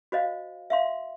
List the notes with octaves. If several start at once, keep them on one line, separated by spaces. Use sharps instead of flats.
F#4 C5 D#5 F5
E5 F5 C6